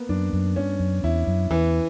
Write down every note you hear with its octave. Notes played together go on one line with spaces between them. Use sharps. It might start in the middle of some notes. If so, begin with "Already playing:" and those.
Already playing: A#3 B3
F#2 D4
F#2
G2 C#4
F#2
E2 E4
F#2
E2 E3